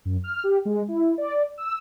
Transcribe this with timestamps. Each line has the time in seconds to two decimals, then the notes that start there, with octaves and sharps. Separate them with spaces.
0.05 F#2
0.24 F6
0.44 G4
0.65 G#3
0.88 E4
1.18 D5
1.58 E6